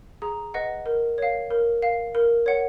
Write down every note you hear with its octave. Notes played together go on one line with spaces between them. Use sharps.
G#4 A#5
B4 D#5 F#5
A#4
C#5 F5
A#4
F5
A#4
C#5 F#5